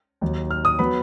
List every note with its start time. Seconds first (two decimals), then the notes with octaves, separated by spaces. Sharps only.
0.21 D#2 D#3 F#3
0.51 F6
0.65 D#6
0.79 F#3 B3 B5